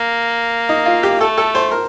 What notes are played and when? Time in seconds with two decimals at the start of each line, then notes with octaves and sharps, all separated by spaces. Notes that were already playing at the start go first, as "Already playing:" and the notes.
Already playing: A#3
0.69 D#4
0.86 F4
1.03 G4
1.20 A3 A4
1.37 A4
1.55 C5
1.71 A#4